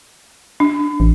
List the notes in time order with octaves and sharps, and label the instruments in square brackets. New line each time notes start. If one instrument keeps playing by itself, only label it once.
[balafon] D4
[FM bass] A1